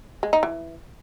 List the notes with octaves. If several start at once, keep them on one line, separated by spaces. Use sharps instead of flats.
G#3
D#4
E3